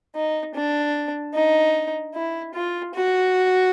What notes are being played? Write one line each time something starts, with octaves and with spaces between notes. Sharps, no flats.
D#4
D4
D#4
E4
F4
F#4